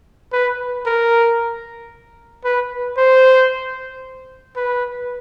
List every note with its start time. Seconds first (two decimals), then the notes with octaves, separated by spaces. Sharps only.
0.32 B4
0.86 A#4
2.44 B4
2.97 C5
4.56 B4